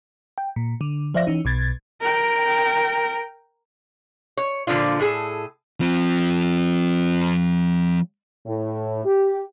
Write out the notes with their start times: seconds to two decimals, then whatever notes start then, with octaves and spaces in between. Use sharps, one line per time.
0.38 G5
0.56 A#2
0.81 D3
1.14 F3 C5 D5 E5 F5 A#6
1.27 E3 C#4 D#4
1.45 B1 B2 G#6 A6
2.01 A#4 G5
4.37 C#5
4.67 A#2 D3 F3 D4 F4
5.00 A2 G#4 A4
5.80 F3 C4
8.47 A2
9.05 G4